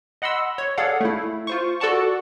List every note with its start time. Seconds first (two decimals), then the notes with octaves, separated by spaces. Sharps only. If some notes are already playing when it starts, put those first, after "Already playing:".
0.22 D#5 F#5 B5 C6 E6
0.58 C#5
0.78 G#4 A4 C#5 D5 F5 F#5
1.01 A3 E4
1.47 F4 C5 C#6
1.80 F#4 A4 D5 F#5 A5 C#6